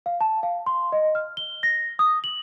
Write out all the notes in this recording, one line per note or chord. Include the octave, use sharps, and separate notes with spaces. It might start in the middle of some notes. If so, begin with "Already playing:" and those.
F5
A5
F5
C6
D#5
F6
G7
A#6
D#6
F#7